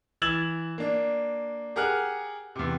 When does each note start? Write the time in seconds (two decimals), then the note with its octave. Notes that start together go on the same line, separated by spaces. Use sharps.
0.22 E3 E6 G#6 A6 E7 F#7
0.78 A#3 D4
1.76 G4 G#4 A#4 F#5 F6 F#6
2.56 E2 C3